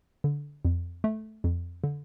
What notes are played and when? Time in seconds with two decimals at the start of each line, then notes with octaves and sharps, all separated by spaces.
0.24 D3
0.65 F2
1.04 A3
1.44 F2
1.84 D3